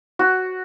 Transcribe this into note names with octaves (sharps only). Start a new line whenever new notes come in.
F#4